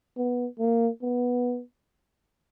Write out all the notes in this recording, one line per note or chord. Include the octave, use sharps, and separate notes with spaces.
B3
A#3
B3